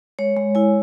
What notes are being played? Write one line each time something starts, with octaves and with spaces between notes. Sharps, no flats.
G#3 C#5
G#3
E4 G#5